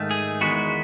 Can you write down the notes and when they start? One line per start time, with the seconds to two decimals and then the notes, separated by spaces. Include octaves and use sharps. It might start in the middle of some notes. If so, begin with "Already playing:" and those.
Already playing: G#2 D#3 A3
0.11 G#4
0.41 E2 D#3 G#3 B3 F#4